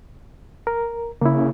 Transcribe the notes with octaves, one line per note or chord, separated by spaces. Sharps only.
A#4
C#3 A#3 E4